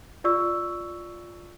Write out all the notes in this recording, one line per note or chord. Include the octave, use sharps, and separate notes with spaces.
F4 D5 C#6 E6